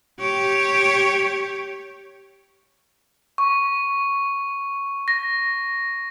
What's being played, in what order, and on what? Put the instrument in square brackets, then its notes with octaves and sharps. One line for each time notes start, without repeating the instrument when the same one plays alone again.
[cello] G4 C#5
[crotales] C#6
A#6